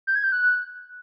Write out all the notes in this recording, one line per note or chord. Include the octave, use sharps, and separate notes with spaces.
G6
G#6
G6
F#6